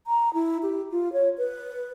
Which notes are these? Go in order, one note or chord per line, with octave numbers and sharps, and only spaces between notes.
A#5
E4
G4
F4
C#5
B4